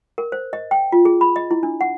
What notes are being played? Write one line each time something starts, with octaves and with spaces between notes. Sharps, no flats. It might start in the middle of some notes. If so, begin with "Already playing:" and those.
A#4
C5
D#5
G5
F4
G#4
B5
D#5
E4
D4
F#5